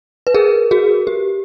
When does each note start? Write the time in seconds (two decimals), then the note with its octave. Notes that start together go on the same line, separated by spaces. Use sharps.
0.27 B4
0.34 G#4 A#4
0.71 F#4 G#4
1.07 G4